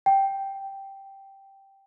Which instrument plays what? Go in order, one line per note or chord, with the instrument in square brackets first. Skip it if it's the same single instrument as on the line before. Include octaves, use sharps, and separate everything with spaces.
[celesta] G5